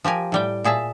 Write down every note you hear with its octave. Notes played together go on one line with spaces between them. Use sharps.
F3 G4 A#4 G#5
A2 G3 G5
A#2 G#4 E5 A5